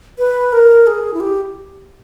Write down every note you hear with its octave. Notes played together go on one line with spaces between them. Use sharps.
B4
A#4
G#4
E4
G4